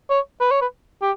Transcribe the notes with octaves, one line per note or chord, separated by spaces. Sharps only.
C#5
B4
C#5
B4
G4